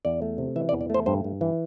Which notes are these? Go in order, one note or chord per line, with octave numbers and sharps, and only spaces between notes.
E2 D5
A3
C3
E3 E5
D5
E2
D5
A3 C5
G2 C5
G2
E3